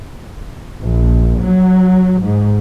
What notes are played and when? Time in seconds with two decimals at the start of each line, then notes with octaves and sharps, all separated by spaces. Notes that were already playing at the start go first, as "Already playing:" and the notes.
0.83 A#1
1.44 F#3
2.22 G#2